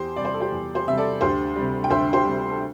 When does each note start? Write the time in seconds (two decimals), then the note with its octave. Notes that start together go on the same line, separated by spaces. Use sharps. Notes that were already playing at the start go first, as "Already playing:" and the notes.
Already playing: E2 G4 C5
0.16 C3 G3 D5
0.25 C5
0.34 A4
0.41 G4 C5
0.52 E2
0.75 G4 C5
0.87 C3 G3 E5
0.97 A4 D5
1.21 D2 G4 C5
1.56 C3 G3
1.84 G5
1.90 D2 C5 E5
2.13 G4 C5
2.25 C3 G3
2.50 A4